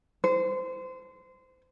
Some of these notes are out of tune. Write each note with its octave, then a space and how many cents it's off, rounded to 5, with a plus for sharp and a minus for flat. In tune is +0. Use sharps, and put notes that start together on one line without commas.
C5 -25